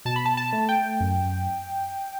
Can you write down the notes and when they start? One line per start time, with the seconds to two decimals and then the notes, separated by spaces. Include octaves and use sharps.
0.05 B2 A5
0.16 B5
0.26 A5
0.37 A5
0.53 A3
0.69 G5
1.00 F#2